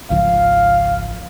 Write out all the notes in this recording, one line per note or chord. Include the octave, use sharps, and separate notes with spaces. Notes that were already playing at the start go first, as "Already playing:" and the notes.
G#1 C#2 F3 F5